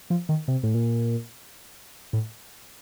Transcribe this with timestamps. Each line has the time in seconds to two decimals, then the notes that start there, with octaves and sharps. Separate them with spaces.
0.10 F3
0.29 D#3
0.48 C3
0.63 A2
0.75 A#2
2.13 A2